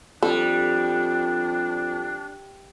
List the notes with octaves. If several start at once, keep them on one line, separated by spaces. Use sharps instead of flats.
F2 G3 D4 A4